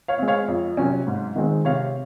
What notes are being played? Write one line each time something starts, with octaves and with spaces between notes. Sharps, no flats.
C#5 F5
G#3 C4
C#5 F5
F2
C3 F#3 C#4
G#2
D#3 G#3 C4
C3 C#5 F5